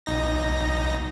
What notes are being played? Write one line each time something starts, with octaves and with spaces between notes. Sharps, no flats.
B1 D#4 A#6